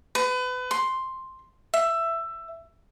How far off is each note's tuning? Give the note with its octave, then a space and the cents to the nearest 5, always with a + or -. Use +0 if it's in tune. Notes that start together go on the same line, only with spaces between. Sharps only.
B4 +30
C6 +5
E5 +15